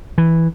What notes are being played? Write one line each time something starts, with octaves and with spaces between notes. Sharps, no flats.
E3